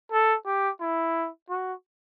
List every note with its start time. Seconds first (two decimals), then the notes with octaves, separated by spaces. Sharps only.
0.11 A4
0.46 G4
0.80 E4
1.49 F#4